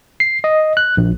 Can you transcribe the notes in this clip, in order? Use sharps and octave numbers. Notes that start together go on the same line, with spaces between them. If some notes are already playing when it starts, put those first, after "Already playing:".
C7
D#5
F#6
A#1